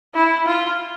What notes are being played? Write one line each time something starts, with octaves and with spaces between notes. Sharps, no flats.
E4
F4